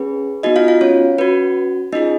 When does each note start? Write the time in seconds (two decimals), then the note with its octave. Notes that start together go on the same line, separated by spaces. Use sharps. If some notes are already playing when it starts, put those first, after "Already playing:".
Already playing: C#4 G#4 B4
0.43 B3 D#4 F#4 D#5
0.56 F4 F5
0.68 F4 F5
0.81 C#4 C#5
1.18 C#4 F#4 B4
1.92 C#4 D#4 F4 G#4 D#5